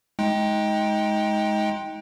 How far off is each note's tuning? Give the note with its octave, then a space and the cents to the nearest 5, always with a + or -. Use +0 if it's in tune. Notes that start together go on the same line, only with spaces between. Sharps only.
G#3 +20 D#4 +30 G5 +0